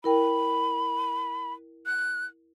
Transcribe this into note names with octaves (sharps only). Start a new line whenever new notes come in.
E4 A#4 G5 B5
F#6